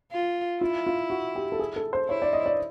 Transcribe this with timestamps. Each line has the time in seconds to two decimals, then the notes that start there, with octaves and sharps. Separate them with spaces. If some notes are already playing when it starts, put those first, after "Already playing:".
0.12 F4
0.61 E4 F4
0.87 F4
1.10 F#4
1.35 G4
1.52 A4
1.59 G#4
1.76 A4
1.93 C5
2.08 E4 C#5
2.22 D5
2.33 D#5
2.46 D5